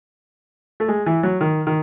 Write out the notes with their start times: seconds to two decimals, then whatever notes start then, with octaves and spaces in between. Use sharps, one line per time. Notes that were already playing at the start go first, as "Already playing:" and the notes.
0.80 A3
0.88 G#3
1.06 E3
1.23 F#3
1.41 D#3
1.67 D#3